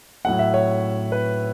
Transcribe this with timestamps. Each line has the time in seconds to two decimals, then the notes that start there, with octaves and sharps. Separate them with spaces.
0.25 A2 F#3 A3 F#5
0.39 E5
0.54 C#5
1.12 B4